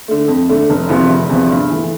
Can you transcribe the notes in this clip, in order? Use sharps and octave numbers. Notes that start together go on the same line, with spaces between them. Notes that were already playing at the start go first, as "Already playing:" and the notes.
D3 A3
F2
D3 A3
F1
E2 C3 F3 B3
F1
E2 C3 F3 B3
G2
E3 A3